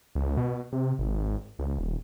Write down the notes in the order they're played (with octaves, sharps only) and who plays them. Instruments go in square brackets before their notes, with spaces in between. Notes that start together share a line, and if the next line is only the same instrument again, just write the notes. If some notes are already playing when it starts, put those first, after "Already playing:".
[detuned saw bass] C#2
B2
C3
G#1
C#2
D#1